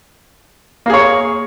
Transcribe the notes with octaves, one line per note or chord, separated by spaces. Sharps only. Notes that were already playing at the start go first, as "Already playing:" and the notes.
A#3 G#4 C#5